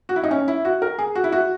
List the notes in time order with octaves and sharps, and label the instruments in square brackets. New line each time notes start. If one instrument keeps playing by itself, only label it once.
[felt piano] F#4
E4
D#4
C#4
E4
F#4
A#4
G#4
F#4
E4
F#4